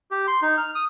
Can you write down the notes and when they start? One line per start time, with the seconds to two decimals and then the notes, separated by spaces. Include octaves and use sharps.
0.11 G4
0.28 C6
0.42 D#4
0.57 F6
0.75 D#6